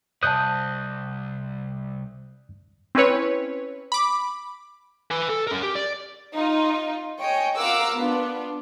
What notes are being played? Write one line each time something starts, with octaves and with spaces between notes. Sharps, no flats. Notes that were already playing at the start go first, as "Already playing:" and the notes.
C2 C5 D#5 A5 D#6 F#6 G6
C4 C#4 E4 B4 C#5
B5 D6
B4 G#5
A4
C#4 A#4
G4
D5
D#4 F4
C#5 D#5 G5 G#5
F4 A#4 F5 F#5 D6 E6
B3 D4 F4